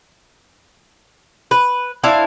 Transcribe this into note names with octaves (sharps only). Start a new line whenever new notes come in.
B4
D4 E4 C5 F5